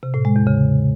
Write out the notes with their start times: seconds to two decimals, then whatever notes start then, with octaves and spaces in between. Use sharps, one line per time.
0.03 C3
0.14 A2
0.25 G#3
0.36 E2
0.47 C#3